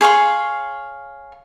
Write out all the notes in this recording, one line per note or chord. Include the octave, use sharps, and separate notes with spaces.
G#4 C#5 F5 C6